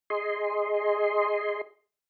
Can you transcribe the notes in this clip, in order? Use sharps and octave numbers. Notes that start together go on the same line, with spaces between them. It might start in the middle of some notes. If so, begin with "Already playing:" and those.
G#4 D#5 C6